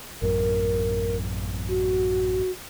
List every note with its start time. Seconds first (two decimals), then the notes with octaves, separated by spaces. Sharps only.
0.22 A1 F#2 A#4
1.68 F#4